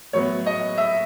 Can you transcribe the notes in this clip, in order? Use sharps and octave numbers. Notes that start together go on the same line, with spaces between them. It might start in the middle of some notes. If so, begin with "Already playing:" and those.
A2 F#3 B3 C#5
D#5
E5